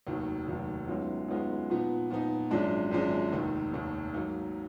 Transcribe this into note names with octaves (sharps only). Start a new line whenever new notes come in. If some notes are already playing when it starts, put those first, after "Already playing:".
F1 D#2 D#3 F#3
F1 D#2 D#3 F#3
F#2 D#3 G#3 B3 F4
F#2 D#3 G#3 B3 F4
A#2 F3 B3 D#4
A#2 F3 B3 D#4
G#1 F#2 F3 G#3 D4
G#1 F#2 F3 G#3 D4
F1 D#2 D#3
F1 D#2 D#3
G#2 F#3 A#3 D#4